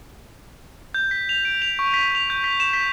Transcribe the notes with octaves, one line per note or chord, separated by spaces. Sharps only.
G6
B6
F7
D7
F7
C#6
B6
F7
G6
B6
E7
B6